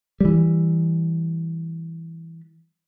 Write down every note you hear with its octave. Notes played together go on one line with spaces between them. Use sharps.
E3 G3